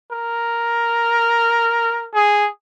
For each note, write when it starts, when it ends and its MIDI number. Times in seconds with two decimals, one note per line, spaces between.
0.12 2.08 70
2.14 2.48 68